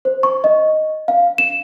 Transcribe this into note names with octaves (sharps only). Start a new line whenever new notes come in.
C5
C#6
D#5
F5
E7